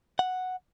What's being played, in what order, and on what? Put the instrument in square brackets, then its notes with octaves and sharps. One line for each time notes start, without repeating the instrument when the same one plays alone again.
[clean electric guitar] F#5